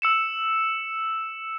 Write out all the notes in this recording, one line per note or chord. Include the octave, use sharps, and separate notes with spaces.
E6 C#7 E7